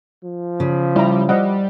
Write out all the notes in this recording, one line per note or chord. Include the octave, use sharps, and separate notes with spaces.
F3
C#3
G3 E4 A#5
G3 C5 D#5 F#5